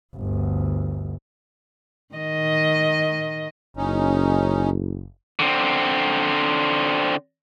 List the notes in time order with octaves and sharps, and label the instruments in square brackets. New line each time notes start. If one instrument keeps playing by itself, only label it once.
[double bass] G1 D2
[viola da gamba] D#3 D#5
[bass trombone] F#1 [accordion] C#4 D#4
[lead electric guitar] D3 C4